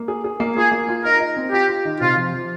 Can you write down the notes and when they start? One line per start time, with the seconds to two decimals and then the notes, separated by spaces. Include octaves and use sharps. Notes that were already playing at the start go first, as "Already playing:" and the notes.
Already playing: A#3
0.08 G#4
0.24 G#4
0.40 A#3
0.57 F4 G#4
0.72 A#3
0.88 F4
1.04 D#4 A#4
1.20 D#4
1.36 C4
1.52 F4 G4
1.68 F4
1.85 D#3
2.01 C3 F4
2.16 F3
2.33 F3